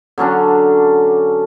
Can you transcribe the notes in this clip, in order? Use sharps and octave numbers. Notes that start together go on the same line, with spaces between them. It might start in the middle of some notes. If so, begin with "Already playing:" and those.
D3 F#3 C#4 D4